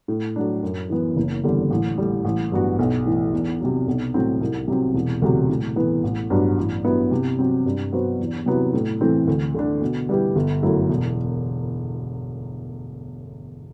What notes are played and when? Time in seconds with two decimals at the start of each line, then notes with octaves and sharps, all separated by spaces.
0.08 A2
0.36 F#3 A3 D4
0.63 F#2
0.90 E3 B3
1.17 F#1
1.44 E2 D3 G3
1.71 A1
1.97 A2 G3
2.25 A1
2.52 G2 F#3 B3 F#4
2.79 B1
3.06 A2 E3
3.33 E2
3.60 C3 F#3
3.87 B1
4.14 A2 F#3 C4 F#4
4.41 C2
4.68 C3 F#3 C4
4.94 E1
5.22 D2 C3 F#3
5.49 A2
5.76 E3 B3
6.04 A1
6.30 G2 F#3 B3 D4
6.57 A1
6.84 G2 F#3 B3 E4
7.11 C3
7.39 F#3 C4
7.66 G2
7.92 F#3 B3 F#4 C5
8.19 E2
8.46 C3 F#3 B3 E4
8.73 A2
9.01 E3 A3 C4
9.28 D2
9.54 D3 A3 D4
9.82 B2
10.09 G3 B3 E4 G4
10.36 G1
10.63 F#2 F#3 A3 E4
10.89 E1